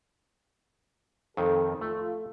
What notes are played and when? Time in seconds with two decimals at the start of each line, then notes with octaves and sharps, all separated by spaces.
1.37 F2 D#3 A4
1.81 A3 F4